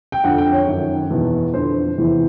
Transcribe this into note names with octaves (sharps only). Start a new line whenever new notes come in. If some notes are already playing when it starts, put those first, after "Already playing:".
G5
F2 D3 F#5
G5
C#5
F#2 D#3
E2 B2
F2 D3 C5
E2 C3 E3